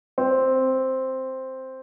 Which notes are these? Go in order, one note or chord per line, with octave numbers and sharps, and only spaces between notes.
C4